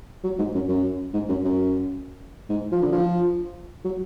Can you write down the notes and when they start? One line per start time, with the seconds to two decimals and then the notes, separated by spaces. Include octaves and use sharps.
0.24 F#3
0.38 G#2
0.54 F#2
0.68 F#2
1.14 G#2
1.29 F#2
1.44 F#2
2.49 G#2
2.72 F3
2.82 D3
2.93 F3
3.85 F#3